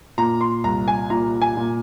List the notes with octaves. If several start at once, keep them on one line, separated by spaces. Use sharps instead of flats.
A#2 A#5
C6
C2 A#5
G#5
A#2 A#5
G#5
A#2